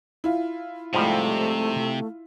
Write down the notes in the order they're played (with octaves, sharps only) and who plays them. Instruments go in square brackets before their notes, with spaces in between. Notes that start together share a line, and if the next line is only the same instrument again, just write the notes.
[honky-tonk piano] E4 F4
[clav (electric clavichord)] G#2 F3 G3 [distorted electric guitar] C3 [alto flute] A3